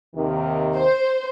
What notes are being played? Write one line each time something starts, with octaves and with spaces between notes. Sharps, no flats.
D#2 C3 D#3
C5